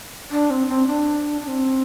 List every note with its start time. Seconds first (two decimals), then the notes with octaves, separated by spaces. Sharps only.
0.31 D4
0.50 C4
0.68 C4
0.87 D4
1.43 D4
1.48 C4